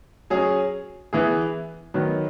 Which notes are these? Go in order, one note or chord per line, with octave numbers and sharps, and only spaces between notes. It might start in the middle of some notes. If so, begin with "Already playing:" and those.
F#3 C#4 G#4
E3 B3 E4 G#4
D#3 F#3 B3